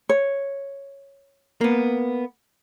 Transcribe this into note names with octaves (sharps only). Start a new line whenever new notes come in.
C#5
A#3 B3